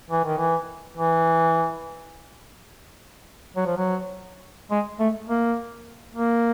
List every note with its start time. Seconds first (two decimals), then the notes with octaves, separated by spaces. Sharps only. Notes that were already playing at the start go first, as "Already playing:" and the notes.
0.11 E3
0.25 D#3
0.38 E3
0.97 E3
3.56 F#3
3.66 F3
3.77 F#3
4.71 G#3
5.00 A3
5.29 A#3
6.15 A#3